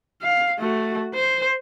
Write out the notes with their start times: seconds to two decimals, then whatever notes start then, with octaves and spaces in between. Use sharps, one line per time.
0.22 F5
0.59 A3 F#4
1.14 C5